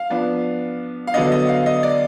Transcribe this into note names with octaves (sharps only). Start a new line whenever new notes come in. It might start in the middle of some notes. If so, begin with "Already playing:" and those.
Already playing: F5
F3 B3 D4
F5
D3 F#3 B3 D4 D#5
D#5
F5
D#5
D5